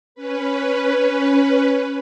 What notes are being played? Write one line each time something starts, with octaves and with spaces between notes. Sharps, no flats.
C#4 B4